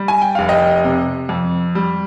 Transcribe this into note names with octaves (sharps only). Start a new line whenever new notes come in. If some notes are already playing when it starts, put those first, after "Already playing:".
Already playing: G3
G#5
G5
F1 F5
D#5 G5
C3
F2
G3